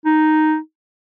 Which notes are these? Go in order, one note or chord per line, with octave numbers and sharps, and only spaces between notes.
D#4